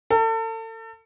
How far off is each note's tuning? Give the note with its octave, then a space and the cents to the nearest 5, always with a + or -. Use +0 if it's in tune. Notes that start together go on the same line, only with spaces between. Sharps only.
A4 +35